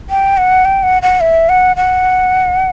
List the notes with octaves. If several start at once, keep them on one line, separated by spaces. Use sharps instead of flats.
G5
F#5
G5
F#5
F#5
E5
F#5
F#5